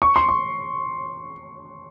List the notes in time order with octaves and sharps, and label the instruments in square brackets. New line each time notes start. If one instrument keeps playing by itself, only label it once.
[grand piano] C#6
C6
C#6